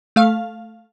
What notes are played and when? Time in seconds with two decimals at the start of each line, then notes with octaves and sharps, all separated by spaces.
0.16 A3 F5